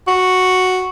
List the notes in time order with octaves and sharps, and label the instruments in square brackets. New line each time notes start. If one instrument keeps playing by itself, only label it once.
[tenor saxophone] F#4